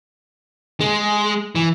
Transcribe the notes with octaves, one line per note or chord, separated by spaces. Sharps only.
G#3
E3